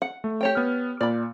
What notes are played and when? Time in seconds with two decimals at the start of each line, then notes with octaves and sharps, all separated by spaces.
0.02 F#5
0.24 A3
0.41 G4 C#5 G5
0.55 B3 F6
1.01 A#2 D5 B5